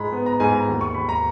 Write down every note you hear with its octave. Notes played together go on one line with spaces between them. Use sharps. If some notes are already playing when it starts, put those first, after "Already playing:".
Already playing: G#2 G#3 A#5 B5
B3
A#5
G#2 G#5
A#5
D#2
C#6
D#2 B5
A#5